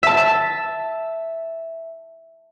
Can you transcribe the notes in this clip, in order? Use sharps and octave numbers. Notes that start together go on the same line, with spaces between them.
E5 A5